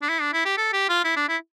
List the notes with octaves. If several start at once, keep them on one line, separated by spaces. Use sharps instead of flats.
D4
E4
D4
E4
G4
A4
G4
F4
E4
D4
E4